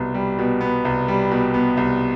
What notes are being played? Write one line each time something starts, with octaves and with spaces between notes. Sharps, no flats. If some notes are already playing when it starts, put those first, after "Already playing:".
Already playing: C2 B2 B3
G3
B2
B3
C2
G3
B2
B3
C2